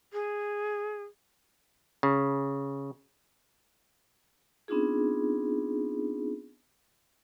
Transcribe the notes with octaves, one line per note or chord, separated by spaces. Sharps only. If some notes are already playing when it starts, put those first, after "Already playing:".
G#4
C#3
B3 C4 D4 D#4 F4 G#4